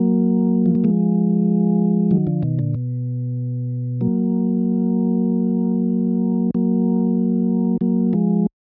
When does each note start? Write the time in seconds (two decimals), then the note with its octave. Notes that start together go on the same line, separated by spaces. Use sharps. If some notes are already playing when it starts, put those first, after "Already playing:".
Already playing: F#3 A#3
0.66 F3
0.75 F#3
0.84 F3 G#3
2.11 D#3 F#3
2.27 D3 F3
2.42 B2 D#3
2.59 A#2 D3
2.74 B2
4.01 F#3 A#3
6.54 F#3 A#3
7.81 F#3 A#3
8.13 F3 G#3